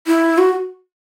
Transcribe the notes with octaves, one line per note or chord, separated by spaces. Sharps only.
E4
F#4